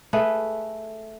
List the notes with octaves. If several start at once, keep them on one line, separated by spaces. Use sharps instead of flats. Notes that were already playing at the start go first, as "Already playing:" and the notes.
A3 G#4 B4